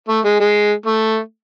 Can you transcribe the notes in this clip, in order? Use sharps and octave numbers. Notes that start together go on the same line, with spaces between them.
A3
G#3
G#3
A3